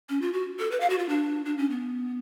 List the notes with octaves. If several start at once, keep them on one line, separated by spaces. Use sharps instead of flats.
C#4
F4
F#4
A4
B4
F5
F#4
F4
D4
D4
C#4
B3